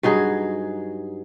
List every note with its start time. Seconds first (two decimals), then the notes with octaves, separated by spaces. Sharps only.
0.03 G2 F#3 D#4 G#4